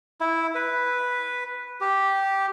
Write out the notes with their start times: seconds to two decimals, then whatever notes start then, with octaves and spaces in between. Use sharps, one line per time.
0.21 E4
0.55 B4
1.81 G4